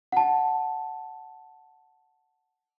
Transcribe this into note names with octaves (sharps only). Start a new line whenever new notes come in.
F#5 A5